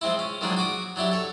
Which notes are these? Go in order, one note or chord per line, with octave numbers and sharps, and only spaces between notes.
F3 G#3 C4 E4
C#4
D#3 F3 F#3 G#3 A#3 D4
F#4 D6 D#6
F#3 D4 E4 G4
A4 C#5